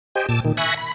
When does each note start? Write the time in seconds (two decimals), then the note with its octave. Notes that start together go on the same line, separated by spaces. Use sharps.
0.15 G4 C5 D#5 G5 G#5
0.29 A#2 A5 D6 E6
0.45 A#2 D#3
0.57 E5 G#5 B5 C#6 F#6 A#6
0.78 B5